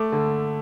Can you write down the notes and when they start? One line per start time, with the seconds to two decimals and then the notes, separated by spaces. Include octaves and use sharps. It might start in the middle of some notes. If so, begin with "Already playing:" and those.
Already playing: A3 D6
0.12 D3